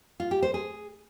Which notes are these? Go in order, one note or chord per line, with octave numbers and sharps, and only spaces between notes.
F4
G4
C5
G#4